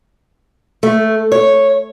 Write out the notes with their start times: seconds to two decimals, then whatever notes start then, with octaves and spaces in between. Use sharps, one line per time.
0.83 A3
1.32 C#5